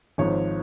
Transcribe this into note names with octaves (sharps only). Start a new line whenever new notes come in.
G#1 G#2 F3 C#5